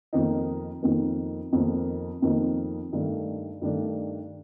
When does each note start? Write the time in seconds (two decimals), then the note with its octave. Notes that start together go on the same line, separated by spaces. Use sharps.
0.13 F2 D#3 A#3 D#4
0.82 F2 D#3 A#3 D#4
1.53 F2 D#3 A#3 D#4
2.22 F2 D#3 A#3 D#4
2.92 G2 D#3 A3 D4
3.62 G2 D#3 A3 D4